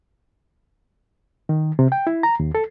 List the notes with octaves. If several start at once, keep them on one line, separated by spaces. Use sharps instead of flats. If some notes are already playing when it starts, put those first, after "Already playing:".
D#3
C3
G5
E4
A#5
D#2
A4